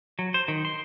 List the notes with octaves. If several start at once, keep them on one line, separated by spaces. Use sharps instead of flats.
F#3
C5
D#3
C6